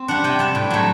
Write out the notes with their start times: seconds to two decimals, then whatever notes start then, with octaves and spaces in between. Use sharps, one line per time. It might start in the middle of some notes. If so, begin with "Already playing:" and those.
Already playing: C4
0.08 G3 D4 F#5
0.24 C3 G5
0.39 G3 D4 A5
0.55 A2
0.70 F#3 A3